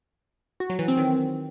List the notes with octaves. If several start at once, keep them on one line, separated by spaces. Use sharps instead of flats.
F#4
F#3
E3
C4
D#3